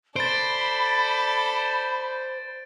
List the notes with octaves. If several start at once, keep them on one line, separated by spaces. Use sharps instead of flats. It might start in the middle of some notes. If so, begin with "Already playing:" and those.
A4 C5 D5 B5 A6 D7